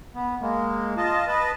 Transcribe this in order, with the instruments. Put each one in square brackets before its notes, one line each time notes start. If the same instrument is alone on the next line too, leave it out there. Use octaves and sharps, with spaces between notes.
[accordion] B3
G#3 A#3
F4 D#5 A5
B4 D#5 A5